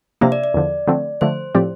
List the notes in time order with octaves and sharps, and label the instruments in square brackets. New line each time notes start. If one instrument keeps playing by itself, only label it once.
[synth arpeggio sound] C3 F3 A#3 D4 [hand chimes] E5
[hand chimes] D5
D5
[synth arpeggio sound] E2 D3 F3
D3 F3 A3 C4
[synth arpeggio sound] D3 F3 A3 [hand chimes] C5
[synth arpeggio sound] A2 F3 C4 G4 D5